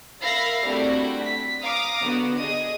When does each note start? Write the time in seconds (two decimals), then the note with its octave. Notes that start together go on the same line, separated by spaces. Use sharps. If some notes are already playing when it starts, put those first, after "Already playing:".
0.21 A#4 E5 F5 B5 A#6 C7
0.65 G3 A3 C4 D4 E4 F#4
1.25 B6
1.63 F5 A#5 D6 D#6
2.03 D3 B3 F#4
2.38 G#4 D#5 D#6